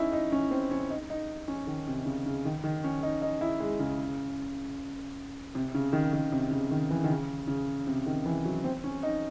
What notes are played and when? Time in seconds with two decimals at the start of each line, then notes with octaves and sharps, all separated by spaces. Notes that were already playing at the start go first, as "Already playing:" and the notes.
Already playing: C#4 D#4 E4
0.13 D#4
0.32 C#4
0.51 C4
0.71 C#4
0.90 D#4
1.10 D#4
1.48 C#4
1.67 D#3
1.87 C3
2.06 C#3
2.26 C#3
2.45 D#3
2.64 D#3
2.84 C#4
3.03 D#4
3.22 D#4
3.41 E4
3.60 G#3
3.80 C#3
5.55 C3
5.75 C#3
5.93 D#3
6.13 D#3
6.32 C3
6.51 C#3
6.71 D#3
6.91 E3
7.04 D#3
7.10 C#3
7.48 C#3
7.87 C3
8.06 D#3
8.26 E3
8.45 F#3
8.64 C4
8.84 C#4
9.03 D#4